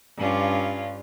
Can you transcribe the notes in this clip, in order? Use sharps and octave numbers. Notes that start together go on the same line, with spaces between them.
G2 C#4 F4